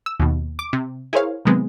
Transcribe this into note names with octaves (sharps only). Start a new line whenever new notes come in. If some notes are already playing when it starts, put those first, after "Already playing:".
E6
D#2 B2
D6
C3
E4 G#4 A#4 C5 C#5 F5
C3 D#3 F#3 G#3 B3 C4